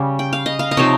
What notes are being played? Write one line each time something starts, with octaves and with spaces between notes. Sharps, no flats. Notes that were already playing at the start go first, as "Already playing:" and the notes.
Already playing: C#3 G3 C#4
G5
F5
D#5
F5
D#5
C3 F3 C4 D#4 C#5